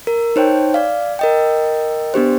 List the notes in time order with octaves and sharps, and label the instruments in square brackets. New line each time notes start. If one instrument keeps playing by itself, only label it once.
[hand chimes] A#4
D#4 C5 C#5 G5
D5 F5
A#4 D#5 G5
B3 D4 G4 C5